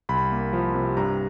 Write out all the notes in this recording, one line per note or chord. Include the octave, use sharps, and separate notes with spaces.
C2 B5
A#3
F3
C3
G2 A#5